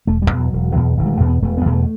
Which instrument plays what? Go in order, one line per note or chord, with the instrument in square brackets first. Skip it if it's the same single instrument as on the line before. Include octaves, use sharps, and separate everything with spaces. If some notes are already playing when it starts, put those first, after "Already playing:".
[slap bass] E1 A3
G3
E2 B2
F#3
E1
E2 B2
E1 D#3
G3
A3
E2 B2
B3
E1 A3
B3
E2 B2
A3